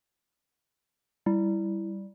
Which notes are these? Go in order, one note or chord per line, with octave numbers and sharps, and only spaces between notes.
G3 E4